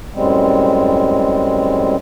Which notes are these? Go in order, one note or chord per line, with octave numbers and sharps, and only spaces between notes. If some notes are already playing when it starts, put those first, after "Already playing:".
F#2 A2 G3 G#3 C4